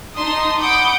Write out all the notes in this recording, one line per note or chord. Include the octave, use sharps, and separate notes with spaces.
D#4 A5 C6 D#6
F#5 B5 D6 D#6 G6 D7